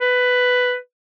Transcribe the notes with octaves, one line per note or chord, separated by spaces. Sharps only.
B4